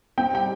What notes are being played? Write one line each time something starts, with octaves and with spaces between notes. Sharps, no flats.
C4 G5
G3 G5